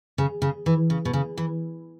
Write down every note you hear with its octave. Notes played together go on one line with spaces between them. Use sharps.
C#3
C#3
E3
C#3
B2
C#3
E3